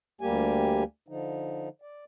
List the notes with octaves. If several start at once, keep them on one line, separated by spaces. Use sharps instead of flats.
D2 G3 A#3 G4 G#5
D3 F3 D#4
D5